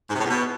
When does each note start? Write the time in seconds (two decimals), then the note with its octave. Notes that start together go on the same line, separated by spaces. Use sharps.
0.10 G#2
0.15 C3
0.20 A2
0.25 E2
0.30 B2